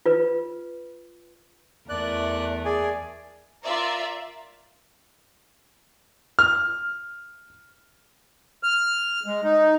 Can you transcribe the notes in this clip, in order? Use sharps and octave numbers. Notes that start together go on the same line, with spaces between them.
F4 B4
E2 A3 A#4 D5 F#6
G#4 D5 G#5
F4 A#4 D5 E5
F6
F6
G#3
D#4